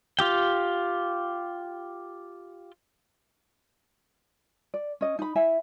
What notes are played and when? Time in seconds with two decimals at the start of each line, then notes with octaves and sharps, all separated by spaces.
0.19 F4 G4 G5
4.74 D5
5.01 C#4 D#5
5.19 D#4 B5
5.35 E4 E5 G#5